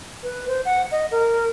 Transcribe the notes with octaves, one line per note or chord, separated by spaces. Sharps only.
B4
C5
F#5
D#5
A#4